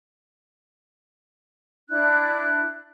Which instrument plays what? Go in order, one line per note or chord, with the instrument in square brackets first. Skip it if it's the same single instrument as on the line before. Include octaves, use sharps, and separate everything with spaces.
[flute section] D4 E4 F#6